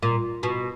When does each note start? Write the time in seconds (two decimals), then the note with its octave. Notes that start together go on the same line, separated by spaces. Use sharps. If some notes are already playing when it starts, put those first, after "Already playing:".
0.03 A#2
0.43 B2